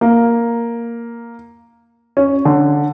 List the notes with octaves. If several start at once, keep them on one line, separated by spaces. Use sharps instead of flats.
A#3
C#4
D3